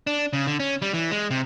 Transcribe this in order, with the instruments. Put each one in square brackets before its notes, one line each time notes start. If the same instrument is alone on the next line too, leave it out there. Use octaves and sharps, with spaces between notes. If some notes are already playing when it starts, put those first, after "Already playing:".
[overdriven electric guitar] D4
C#3
D3
C#4
G3
E3
G#3
C3